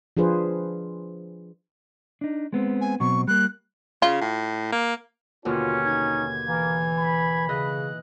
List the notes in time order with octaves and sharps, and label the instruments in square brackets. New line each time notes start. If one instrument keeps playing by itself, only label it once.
[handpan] F3 D4 F4 G#4 B4 C5
[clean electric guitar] D4 D#4
G#3 B3 C4
[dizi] G#5
[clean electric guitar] B2 F#3 C4 [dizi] C#6
[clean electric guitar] G3 A#3 [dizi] F#6
[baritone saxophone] C#3 [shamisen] F4
[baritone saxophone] A2
A#3
[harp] D#2 B2 D3 [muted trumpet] C#4 [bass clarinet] F4
[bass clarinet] D#4 [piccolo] G#6
[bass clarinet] E3 [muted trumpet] A#3
[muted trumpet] B5
[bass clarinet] C#3 [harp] E3 D#5 [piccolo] F#6